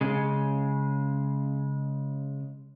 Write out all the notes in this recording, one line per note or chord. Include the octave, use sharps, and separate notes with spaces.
C#3 G#3